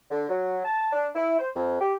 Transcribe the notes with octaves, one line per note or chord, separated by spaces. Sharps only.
D3
F#3
A5
D4
E4
C5
F2
G4